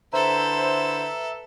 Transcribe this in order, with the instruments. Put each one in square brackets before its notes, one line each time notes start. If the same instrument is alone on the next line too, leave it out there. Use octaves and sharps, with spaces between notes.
[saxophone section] D3 E4 C5 [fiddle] A4 B4 [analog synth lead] E5 [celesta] A#5